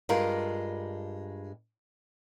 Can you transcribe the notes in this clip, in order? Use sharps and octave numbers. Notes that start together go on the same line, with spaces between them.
G2 G#3 F4 A#4